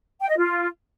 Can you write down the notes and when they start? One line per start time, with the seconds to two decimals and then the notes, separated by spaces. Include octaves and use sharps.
0.21 G5
0.29 D#5
0.38 F4